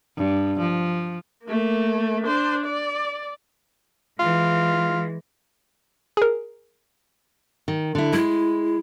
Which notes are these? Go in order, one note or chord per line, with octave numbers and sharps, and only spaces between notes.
G2
F3
A3 A#3
D4 C5
D5
E3 G#3 F4
G#4 A#4
D#3
D3 E4
G#3 E4